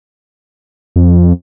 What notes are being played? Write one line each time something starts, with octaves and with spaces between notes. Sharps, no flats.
F2